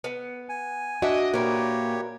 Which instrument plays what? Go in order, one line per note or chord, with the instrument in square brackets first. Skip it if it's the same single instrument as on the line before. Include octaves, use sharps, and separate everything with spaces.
[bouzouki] B3
[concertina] G#5
[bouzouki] D4 [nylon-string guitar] F#4 E5 [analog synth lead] D#5
[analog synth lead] A#2 [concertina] G4 C#5 [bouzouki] A#4 B4